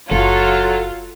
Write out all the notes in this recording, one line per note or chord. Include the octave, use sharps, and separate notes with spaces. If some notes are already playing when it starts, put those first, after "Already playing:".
F#1 F#3 F4 A4